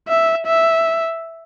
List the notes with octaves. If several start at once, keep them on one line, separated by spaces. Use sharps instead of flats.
E5
E5